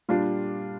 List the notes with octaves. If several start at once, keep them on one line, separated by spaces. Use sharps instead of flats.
A#2 G3 D4 F4